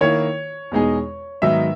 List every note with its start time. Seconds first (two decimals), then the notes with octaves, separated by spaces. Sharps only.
0.01 D#3 A#3 E4 C#5
0.72 E2 B2 G#3 D#4 G#4
1.42 G#2 D#3 F#3 B3 D#4 E5